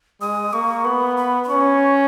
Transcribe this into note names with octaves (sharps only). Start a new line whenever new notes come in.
G#3 D#6
A#3 C#6
B3 B5
B5
B5
C#4 C#6